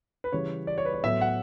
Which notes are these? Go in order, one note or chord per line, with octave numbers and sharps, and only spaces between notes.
B4
C#3 E3 G3 C#5
D5
C#5
B4
C#5
A2 F#3 B3 E5
F#5